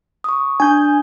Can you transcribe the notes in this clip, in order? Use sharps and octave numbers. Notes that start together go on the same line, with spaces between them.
C#6 D#6
D4 G#5 D#6 G6